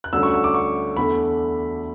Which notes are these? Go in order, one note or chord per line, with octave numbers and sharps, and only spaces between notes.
F#6
D2 D3 G3 C#4 E6
C#6
E6
D6
C#6
E2 D3 A3 B5